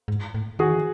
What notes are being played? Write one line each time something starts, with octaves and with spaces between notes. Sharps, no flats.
G#2
A2
D#3 F#4 G#4
E3